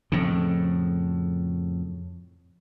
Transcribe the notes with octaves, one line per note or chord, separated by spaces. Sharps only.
F2 A2 C#3